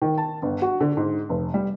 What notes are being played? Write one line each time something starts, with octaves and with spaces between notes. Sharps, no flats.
D#3
A5
G1
F#4
D3
G#2
F1
G3